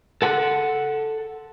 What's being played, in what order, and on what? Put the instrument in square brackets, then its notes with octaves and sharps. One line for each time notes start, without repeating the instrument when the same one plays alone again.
[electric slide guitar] A4 F#5